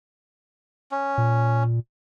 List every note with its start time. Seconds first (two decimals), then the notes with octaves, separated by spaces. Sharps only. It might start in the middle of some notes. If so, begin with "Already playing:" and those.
0.91 C#4
1.18 A#2